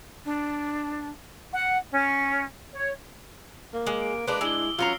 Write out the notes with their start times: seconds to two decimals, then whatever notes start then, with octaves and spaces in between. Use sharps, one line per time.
0.25 D4
1.53 F#5
1.91 C#4
2.73 C#5
3.74 A#3
3.87 G#3 D6
4.01 D7
4.27 G#3 A#3 D4 B4
4.41 G#3 D4 E4 E6 F#7 G7
4.79 F#3 C#4 F4 A#5 F6 A#6 C7